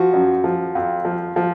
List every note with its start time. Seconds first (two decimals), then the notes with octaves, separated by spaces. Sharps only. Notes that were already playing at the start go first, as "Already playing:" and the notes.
Already playing: F3 F#4
0.13 F#2
0.44 F3
0.75 F2
1.05 F3
1.36 F3